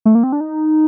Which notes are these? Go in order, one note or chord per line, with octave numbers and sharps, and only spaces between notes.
A3
A#3
C4
D4
D#4